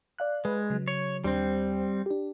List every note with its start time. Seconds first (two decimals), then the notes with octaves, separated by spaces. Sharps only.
0.19 D5 F5 F#6
0.45 G#3 B4
0.70 C#3 F#3
0.88 C#5
1.24 D#2 G3 C4 D4 C5
2.06 D4 G4